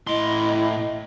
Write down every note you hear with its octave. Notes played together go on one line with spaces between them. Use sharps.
A2 E4 D#5 C6